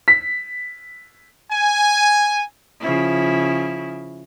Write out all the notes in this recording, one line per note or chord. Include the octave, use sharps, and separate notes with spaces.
B6
G#5
C#3 F3 E4